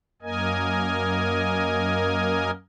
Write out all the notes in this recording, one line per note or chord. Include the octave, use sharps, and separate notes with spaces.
F#2 A#3 A#4 D#5 G#5